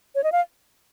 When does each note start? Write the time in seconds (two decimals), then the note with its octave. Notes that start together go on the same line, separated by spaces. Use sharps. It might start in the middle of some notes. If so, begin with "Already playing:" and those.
0.15 C#5
0.24 D#5
0.32 F5